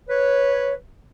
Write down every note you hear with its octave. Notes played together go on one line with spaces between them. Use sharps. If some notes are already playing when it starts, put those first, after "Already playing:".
B4 C#5